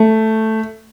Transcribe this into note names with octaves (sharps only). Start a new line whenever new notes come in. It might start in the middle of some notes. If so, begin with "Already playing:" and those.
Already playing: A3